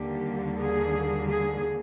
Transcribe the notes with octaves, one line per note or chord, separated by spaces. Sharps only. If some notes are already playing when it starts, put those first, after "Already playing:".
Already playing: D#2 D3 G3 A#3 G4
G#4
G#4